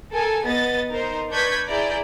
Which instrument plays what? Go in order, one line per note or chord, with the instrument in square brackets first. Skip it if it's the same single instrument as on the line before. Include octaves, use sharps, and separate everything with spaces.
[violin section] A4 A#4 G#5
B3 D#5 A6
D#4 A#4 C5
D4 B4 C#6 G6 G#6 B6
E4 G#4 D5 A#5 G6